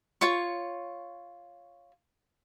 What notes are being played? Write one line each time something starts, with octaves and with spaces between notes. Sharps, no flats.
F4 C#5 C#6